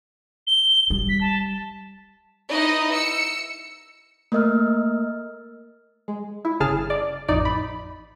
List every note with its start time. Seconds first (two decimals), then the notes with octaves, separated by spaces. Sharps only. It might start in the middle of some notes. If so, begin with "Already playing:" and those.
0.47 G7
0.90 G3
1.09 B6
1.21 A5
2.50 D#4 E4 B4 D#5
2.94 E6 C#7
4.32 A3 A#3 A#4 D#5 E6 F6
6.08 G#3
6.45 E4
6.60 G1 C#3 G#4 A5 F6
6.90 D5
7.28 A1 F2 D#4 D5
7.45 B5